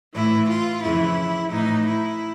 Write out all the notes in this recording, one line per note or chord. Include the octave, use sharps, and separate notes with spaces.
A2 E3 E4
F4
F2 C#3 E3 E4
A2 E3 D#4
E4